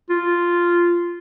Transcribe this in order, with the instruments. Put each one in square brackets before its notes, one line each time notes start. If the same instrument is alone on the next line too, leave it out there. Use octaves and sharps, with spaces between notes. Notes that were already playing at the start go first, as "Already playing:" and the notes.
[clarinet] F4